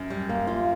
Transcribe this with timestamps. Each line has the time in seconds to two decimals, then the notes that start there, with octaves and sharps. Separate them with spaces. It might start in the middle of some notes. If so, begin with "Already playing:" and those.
Already playing: F#2
0.10 G3
0.29 A#3
0.47 F4